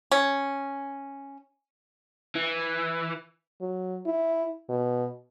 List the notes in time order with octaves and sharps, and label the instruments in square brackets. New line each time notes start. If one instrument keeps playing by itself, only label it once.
[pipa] C#4
[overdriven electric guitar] E3
[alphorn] F#3
E4
B2